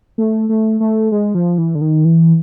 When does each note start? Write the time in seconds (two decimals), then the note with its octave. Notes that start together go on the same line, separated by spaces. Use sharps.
0.18 A3
0.49 A3
0.80 A3
1.12 G#3
1.35 F3
1.58 E3
1.75 D3
1.81 D#3
2.05 E3